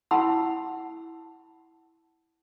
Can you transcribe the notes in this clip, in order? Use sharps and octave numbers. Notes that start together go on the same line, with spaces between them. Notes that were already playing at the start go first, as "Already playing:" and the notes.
E4 F#5 A5 B5 C6 E6